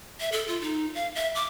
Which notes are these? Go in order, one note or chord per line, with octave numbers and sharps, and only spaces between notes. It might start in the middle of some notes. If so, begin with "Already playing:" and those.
E5
A4
F4
D#4
F5
E5
D6